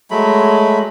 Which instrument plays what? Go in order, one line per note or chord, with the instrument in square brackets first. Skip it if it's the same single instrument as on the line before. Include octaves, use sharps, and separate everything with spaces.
[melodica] F#3 G#3 A3 B5